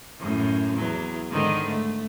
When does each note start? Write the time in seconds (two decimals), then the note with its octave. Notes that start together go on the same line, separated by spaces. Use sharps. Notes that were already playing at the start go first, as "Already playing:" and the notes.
0.19 F#2 A2
0.75 E2 F#3
1.29 G#2 D3 D#3
1.68 A3